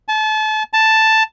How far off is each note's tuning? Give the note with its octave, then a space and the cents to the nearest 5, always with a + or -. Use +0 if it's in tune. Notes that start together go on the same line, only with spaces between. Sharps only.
A5 -30
A5 +5